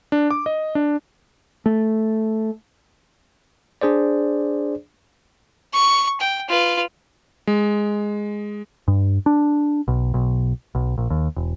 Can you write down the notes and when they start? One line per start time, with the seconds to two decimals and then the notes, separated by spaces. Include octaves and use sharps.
0.12 D4
0.30 D6
0.46 D#5
0.75 D4
1.66 A3
3.81 D4 G#4 C5 D5
5.74 C#6
6.20 G5
6.49 F4 B4
7.47 G#3
8.88 G2
9.26 D4
9.88 B1
10.14 B1
10.75 B1
10.98 A#1
11.10 D#2
11.36 E1